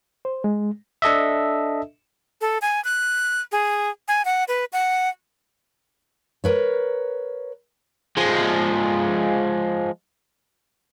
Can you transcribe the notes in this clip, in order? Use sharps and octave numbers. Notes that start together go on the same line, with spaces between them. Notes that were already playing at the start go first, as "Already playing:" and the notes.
C5
G#3
D4 A4 D#5 E5
A4
G#5
F#6
G#4
G#5
F#5
B4
F#5
A#4 B4 C#5
F3 G#3